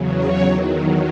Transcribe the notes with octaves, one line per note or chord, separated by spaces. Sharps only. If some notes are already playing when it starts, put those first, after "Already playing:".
Already playing: E2 C#3 F#3
C#5
E2 D#3 F#3